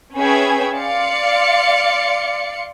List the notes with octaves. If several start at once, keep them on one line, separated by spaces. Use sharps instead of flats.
C#4 G#4 B4 E5 G5 G#6
D5 F5 C6 C#7